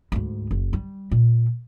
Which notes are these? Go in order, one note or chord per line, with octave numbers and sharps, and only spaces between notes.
D2 G#2
F#1
G3
A#2